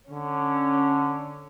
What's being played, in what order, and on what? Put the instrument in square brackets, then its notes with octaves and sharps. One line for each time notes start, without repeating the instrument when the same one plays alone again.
[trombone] D3 [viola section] C#4